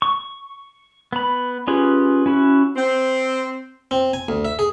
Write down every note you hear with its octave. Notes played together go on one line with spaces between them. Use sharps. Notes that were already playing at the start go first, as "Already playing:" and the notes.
C#6
B3 B5
C#4 F4 G4 G#4 B4
C#4 E4 F#4
C4
C4
G#5
D2
E5
G#4